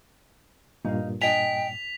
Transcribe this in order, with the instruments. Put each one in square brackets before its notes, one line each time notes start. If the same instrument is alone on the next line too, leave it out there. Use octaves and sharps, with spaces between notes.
[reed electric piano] G2 A#2 [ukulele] D#4 F5
[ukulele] D4 D#5 G#5 [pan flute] G5 [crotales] B6 F7